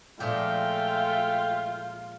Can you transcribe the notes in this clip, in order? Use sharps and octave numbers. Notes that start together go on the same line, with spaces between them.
A#2 F3 G#3 A3 F4 G5